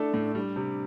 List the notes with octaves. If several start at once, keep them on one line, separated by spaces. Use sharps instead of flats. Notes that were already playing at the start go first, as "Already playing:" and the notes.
Already playing: A3 D4 E4 A4
A2
G3 D4
C3